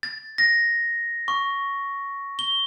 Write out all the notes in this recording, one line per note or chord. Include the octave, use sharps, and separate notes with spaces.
A6
A#6
C#6
G7